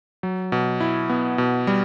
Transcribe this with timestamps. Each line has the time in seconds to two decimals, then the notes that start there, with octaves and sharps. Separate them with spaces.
0.23 F#3
0.52 B2
0.80 E4
1.10 B3
1.38 B2
1.67 G3